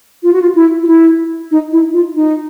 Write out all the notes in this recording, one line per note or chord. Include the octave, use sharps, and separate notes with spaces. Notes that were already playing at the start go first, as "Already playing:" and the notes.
F4
F#4
F4
E4
F4
E4
D#4
E4
F4
D#4